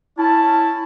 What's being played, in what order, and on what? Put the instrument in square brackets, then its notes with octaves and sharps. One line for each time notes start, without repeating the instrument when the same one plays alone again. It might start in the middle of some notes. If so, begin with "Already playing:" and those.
[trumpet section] C#4 A5 [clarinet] E4